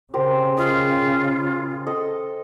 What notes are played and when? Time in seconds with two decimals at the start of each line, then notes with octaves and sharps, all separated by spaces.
0.14 C#3 G4 A#4 C5
0.57 F4 D#5
1.87 A4 D#5